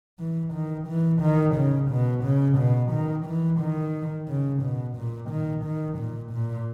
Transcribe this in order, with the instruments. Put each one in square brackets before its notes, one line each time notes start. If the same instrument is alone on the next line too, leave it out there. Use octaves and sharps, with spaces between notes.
[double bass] E3
D#3
E3
D#3
C#3
B2
C#3
B2
D#3
E3
D#3
C#3
B2
A#2
D#3
D#3
A#2
A#2